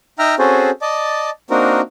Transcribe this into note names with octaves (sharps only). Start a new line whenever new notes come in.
D#4 E5 G5 A#5 F6
C4 C#4 F#4 G#4 A4 C5
D5 D#5 A5
A#3 C4 D4 D#4 F#4 A#4